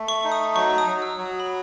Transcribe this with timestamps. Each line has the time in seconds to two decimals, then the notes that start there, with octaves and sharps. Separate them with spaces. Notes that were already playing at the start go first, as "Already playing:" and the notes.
Already playing: A3
0.08 C#6
0.24 D#4
0.32 D#6
0.55 F#3 C#6
0.78 D#6
0.87 F#3
1.02 E6
1.17 F#3
1.26 D#6
1.40 B5